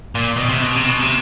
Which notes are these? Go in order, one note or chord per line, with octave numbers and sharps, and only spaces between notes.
A#2
B2
C3
B2
C3
B2
C3